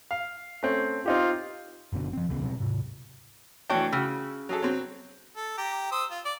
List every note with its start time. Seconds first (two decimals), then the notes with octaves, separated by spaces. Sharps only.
0.11 F5
0.63 A3 C4 C#4
1.06 C4 D#4 F4 G4
1.93 F#1 B2 D3
2.13 F3 C4
2.29 D#1 C#2 C#3 B3
2.42 B2 F#3 C4
2.60 G#2 C3
3.70 E3 A3 D4 F#4 C#5 G5
3.92 C#3 F#4 E6
4.49 F#3 G#4 A4
4.62 F#3 C4
5.36 A4
5.58 G4 A#5
5.92 C5 D#6 E6
6.11 F4
6.25 D5